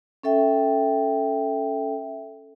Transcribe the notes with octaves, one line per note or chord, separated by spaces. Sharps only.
C#4 A4 E5 G5